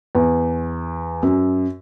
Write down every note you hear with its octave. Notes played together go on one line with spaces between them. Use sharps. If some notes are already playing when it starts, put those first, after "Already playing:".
E2
F#2